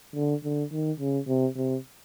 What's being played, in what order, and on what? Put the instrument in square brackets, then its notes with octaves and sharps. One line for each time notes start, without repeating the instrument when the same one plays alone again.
[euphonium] D3
D3
D#3
C#3
C3
C3